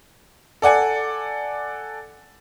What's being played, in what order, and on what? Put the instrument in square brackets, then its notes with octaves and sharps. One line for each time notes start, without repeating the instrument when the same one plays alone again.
[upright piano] A4 D5 F#5 G#5